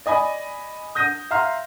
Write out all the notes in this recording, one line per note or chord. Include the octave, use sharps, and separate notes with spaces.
D5 D#5 G#5 B5
D#6 G6 A#6 D#7
E5 F5 A#5 C6 F6